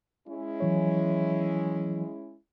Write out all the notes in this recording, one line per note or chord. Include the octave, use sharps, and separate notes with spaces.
G#3 C#4 E4
E3 F#3 C#5